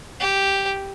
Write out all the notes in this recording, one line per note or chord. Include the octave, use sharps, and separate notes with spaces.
G4